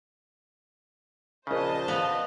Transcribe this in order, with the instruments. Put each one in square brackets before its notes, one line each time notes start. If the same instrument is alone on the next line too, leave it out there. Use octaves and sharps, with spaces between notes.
[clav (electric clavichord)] A#1 C#3 [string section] C5 D#5 A5
[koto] B3 [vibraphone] F5